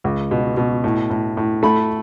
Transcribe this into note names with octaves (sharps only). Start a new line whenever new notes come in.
C#2
B2
B2
A2
A2
A2
A3 B5